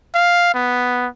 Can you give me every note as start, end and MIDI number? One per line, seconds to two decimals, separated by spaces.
0.15 0.52 77
0.54 1.07 59